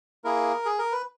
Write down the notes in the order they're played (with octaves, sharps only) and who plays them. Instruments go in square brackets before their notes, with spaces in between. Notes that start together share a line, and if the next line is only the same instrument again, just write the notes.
[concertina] A#3 E4 G#4 A#4
G#4
A#4
B4